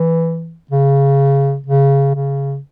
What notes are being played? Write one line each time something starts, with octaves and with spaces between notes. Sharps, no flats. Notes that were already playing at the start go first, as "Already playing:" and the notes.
Already playing: E3
C#3
C#3
C#3